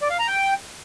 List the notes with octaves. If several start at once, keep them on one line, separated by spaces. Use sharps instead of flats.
D5
F5
A#5
G5